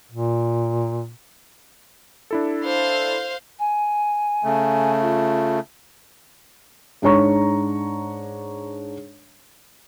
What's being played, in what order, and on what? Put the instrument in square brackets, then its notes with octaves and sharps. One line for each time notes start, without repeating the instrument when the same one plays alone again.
[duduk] A#2
[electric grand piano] D4 E4 A4
[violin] C5 F5
[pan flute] G#5
[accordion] C#3 A3
[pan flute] F4
[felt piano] G#2 D4 D#4 C#5 A#5 C#6